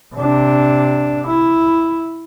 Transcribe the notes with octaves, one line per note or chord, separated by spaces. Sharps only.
C3 D4
E4